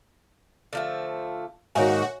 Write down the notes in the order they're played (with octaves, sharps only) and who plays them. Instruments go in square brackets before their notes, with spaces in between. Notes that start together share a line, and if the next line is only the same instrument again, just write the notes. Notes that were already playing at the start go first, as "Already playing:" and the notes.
[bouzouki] D3 F3 A3
[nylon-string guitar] G#2 D#3 [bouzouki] A#3 D#4 [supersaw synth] F#4 [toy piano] C#5 E5 G#5